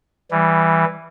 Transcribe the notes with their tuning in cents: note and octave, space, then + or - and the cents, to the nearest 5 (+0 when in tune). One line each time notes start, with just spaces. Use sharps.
E3 +0 G3 +0